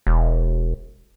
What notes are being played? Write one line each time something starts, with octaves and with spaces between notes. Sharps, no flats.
E1